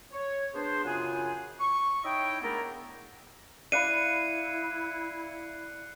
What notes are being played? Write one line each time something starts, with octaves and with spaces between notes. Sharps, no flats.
C#5
B3 D4 G#4 C5
F#2 C#3 F4 G#4 F#5 G#5
C#6
D#4 E4 C#5 D#5 E5 G5
G#3 A3 B3 D4 E4 A#4
E4 D5 F5 B5 F#6 C7 C#7 D#7